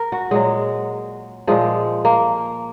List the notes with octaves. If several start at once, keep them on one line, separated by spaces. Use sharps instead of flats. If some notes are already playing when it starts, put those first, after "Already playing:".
Already playing: A#4
F#4
A#2 F#3 G#3
A#2 F3 G#3
A#3